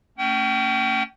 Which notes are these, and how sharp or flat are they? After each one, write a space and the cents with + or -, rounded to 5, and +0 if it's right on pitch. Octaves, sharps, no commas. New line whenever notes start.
A3 +40 C#4 +0 G5 -40